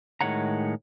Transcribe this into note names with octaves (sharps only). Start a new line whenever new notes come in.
A2 D#3 G#3 C#5 F#5 A#5